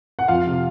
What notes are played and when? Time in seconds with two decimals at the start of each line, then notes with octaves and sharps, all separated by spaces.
0.19 F#5
0.28 F2 F4 F5
0.47 C3